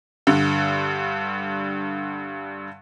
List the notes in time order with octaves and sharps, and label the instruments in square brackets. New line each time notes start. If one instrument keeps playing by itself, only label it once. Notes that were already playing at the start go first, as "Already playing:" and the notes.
[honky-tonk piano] G2 D3